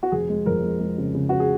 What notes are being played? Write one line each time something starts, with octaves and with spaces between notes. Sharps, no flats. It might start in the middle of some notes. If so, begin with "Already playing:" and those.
F#4
F1 G#4
G#3
F2 A#4
G#3
G#3
C#3
C#3
C#3 F#4
G#4